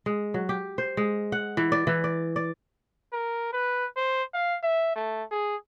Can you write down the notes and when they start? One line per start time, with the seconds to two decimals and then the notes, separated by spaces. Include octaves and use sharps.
0.06 G#3
0.34 F#3
0.49 G4
0.78 C5
0.97 G#3
1.32 F#5
1.57 E3
1.72 D5
1.87 E3
2.04 D5
2.36 D5
3.13 A#4
3.53 B4
3.96 C5
4.34 F5
4.63 E5
4.95 A3
5.31 G#4